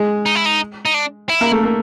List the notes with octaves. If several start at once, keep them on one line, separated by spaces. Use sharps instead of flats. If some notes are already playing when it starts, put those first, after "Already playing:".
Already playing: G#3 G#4
D#4
E4
D#4
D#4
D4
E4
A#3 A#4
A3 A4
A#3 A#4